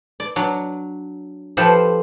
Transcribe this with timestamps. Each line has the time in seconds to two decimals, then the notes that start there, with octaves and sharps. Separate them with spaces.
0.20 D5
0.36 F#3 D4
1.57 F3 G4 A4 B4 C5